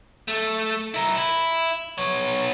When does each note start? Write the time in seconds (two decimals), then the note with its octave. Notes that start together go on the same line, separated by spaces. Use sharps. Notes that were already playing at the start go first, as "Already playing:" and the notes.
0.28 A3
0.94 E4 A#4
1.17 E4
1.98 B3 C#5